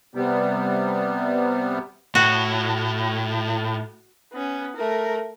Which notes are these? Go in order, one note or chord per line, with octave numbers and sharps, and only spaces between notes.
C3 G3 B3
A2 F#4
B3 C#4
A3 A#4